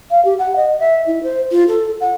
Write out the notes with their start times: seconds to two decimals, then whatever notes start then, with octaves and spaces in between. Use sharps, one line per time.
0.11 F5
0.25 G4
0.39 F#5
0.56 D#5
0.79 E5
1.07 E4
1.23 C5
1.52 F4
1.68 A4
2.01 F#5